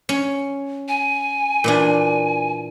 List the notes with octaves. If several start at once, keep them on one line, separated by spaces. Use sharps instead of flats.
C#4
G#5
A#2 E3 D4